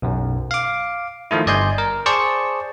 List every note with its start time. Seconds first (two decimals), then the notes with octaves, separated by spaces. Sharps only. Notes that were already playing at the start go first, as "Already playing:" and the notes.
0.02 B1 F#2
0.51 F5 D6
1.31 D#3 F3 A3 E4
1.47 G1 D5 D#5 G#5 C6 G6
1.78 A#4
2.06 G#4 C5 D5 A5 C#6